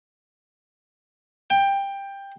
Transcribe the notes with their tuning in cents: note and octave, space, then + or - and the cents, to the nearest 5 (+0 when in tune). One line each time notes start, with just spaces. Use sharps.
G5 +15